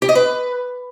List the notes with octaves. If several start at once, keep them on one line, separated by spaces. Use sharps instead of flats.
G4
D#5
B4